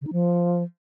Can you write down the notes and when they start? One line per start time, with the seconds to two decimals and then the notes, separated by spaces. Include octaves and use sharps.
0.01 C#3
0.07 D#4
0.12 F3